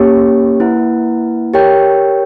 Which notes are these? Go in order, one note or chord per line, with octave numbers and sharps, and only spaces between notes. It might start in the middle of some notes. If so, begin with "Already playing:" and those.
Already playing: A#3 C#4 G4 C#5
A#3 E4 B4 F#5
G4 A#4 C#5 G5